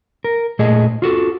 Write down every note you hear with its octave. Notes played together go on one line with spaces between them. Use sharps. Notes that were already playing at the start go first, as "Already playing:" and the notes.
A#4
A#2 A3 G#4 D#5
F4 F#4 A4